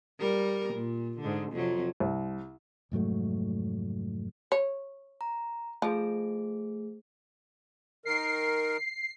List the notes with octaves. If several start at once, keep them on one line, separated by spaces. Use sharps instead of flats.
G3 A#4
A#2
G#2 D3
F2 C3 F#3
C2
F1 G#2 F#3 A3
C#5
A#5
F3 A3 G#4
D#3 A#4 C7